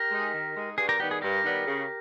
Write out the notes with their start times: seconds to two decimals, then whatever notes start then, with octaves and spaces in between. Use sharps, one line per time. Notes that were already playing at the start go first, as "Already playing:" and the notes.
Already playing: G4 A#4
0.11 G#3 D#4 G#4
0.34 D#3
0.55 G#3 D#4 G#4
0.77 G2 G#4
0.89 G4 A#4
0.99 D#3 G3 B3 G4
1.11 G#4
1.22 G2 G4 A#4
1.44 D#3 G3 B3
1.66 C#3